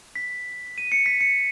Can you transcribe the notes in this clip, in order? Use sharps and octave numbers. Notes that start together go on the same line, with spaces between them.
B6
D#7
C#7
B6
C#7